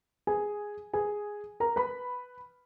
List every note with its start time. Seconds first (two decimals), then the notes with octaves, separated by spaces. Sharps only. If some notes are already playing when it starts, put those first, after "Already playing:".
0.27 G#4 G#5
0.93 G#4 G#5
1.60 A#4 A#5
1.76 B4 B5